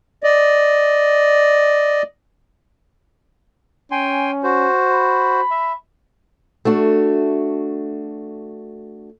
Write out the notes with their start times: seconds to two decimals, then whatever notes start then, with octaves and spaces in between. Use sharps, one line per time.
0.23 D5 D#5
3.91 C#4 G5 G#5 C6
4.43 F#4 C5
4.92 B5
5.51 E5
6.65 A3 D4 F#4